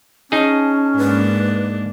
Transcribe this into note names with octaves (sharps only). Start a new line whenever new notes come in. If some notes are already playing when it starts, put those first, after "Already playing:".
C#4 D#4 G#4 A5
G#2 A#3 D4 B4